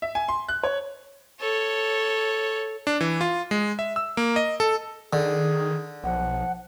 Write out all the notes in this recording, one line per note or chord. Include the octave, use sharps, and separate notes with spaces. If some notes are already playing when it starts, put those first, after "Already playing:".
E5
G#5
C6
F#6
C#5
A4 C#5
D4
E3
F4
G#3
E5
E6
A#3
D#5
A4
D3 D#3 G#4
B1 F3 F#5